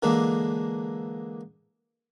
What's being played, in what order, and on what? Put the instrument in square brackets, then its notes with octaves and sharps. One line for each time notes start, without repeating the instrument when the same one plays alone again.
[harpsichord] D3 E3 G#3 A#3 D4